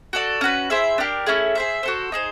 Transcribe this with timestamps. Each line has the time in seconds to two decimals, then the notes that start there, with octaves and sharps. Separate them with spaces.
0.13 F#4 A4 D5
0.41 C#4 F#4 B4
0.70 E4 G#4 C5 E5
0.98 D4 G4 A#4
1.26 A3 C#4 E4 G#4
1.55 G#4 C5 E5
1.83 F#4 A4 C5
2.12 D#4 G#4 C5